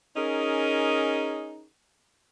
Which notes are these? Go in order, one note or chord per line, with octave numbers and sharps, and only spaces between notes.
C#4 D#4 G#4 A#4